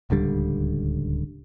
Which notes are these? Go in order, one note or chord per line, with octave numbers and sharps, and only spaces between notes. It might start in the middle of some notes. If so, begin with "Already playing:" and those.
D1 C#2 D3 G3